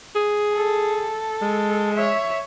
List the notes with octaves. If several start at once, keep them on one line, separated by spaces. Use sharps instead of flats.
G#4
A4
G#3
C#5 E5